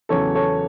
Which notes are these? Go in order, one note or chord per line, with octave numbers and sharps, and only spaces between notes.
E2 C#3 F#3 C#4 A4 C#5
A4 C#5